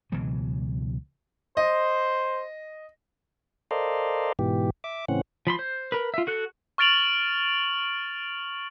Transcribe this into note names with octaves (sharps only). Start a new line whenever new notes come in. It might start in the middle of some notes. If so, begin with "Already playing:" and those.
C#2 B2 E3 F#3
C5 D#5
A4 A#4 C5 D5 D#5 F5
G#2 B2 E3 G4
E5 D6
A2 C#3 E3 C4 C#4 F#5
F3 B5 C6
C5
A#4 B4
F4 E5
F#4 A4 F#6
C#6 F6 A6 D7 F7 F#7